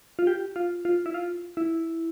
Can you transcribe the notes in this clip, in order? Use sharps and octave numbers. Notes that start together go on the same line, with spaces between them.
F4
G4
F4
F4
E4
F4
E4